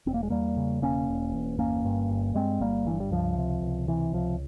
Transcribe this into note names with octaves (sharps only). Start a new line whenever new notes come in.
E1 C4
A#3
G#3
E2 G3 A#3
C#3
E1 A#3 C#4
E1
E2
G1 A#3 C#4
G2
G1
G2 G#3 C4
G1 G3 A#3
G2 E3
G3
C#2 F3
C3
C#2
C3 E3
C#2 F3